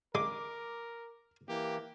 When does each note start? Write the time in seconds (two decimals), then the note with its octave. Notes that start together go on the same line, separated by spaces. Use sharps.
0.15 G#3 A#4 D6
1.49 E3 A#3 G4